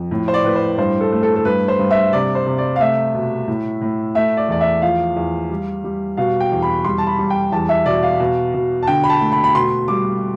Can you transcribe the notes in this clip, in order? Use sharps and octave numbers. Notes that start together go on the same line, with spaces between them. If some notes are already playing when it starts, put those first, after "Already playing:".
Already playing: F2
A2
C5
D5
A2 B4
C5
G2 C5
A4
A3
A4
A4
G2 B4
C5
G2
E5
C3 D5
C5
C3
D5
F5
A3 E5
B2
A2
A2
A3 E5
D5
E2 D5
E5
F3 F5
E2
G3
G3
B2 F5
G5
E2
B5
G3 C6
A5
B5
G3
G5
E2 A5
E5
B2 D5
F5
B2
B2
A5
D3 G5
B5
A5
A3
B5
B5
B2 C6
G3 D6